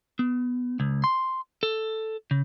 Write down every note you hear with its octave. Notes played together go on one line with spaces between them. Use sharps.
B3
C#2
C6
A4
C#3